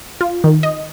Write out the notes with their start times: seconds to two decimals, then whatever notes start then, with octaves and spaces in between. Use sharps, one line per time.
0.21 F4
0.44 D#3
0.63 D#5